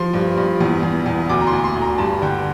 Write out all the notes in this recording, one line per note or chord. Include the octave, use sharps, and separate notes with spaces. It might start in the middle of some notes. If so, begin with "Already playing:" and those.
Already playing: F3 C6
G2
G2
E2
E2
E2
D2 D6
A#5
C6
D2
C6
D2
A#5
G2 A5
D3 G5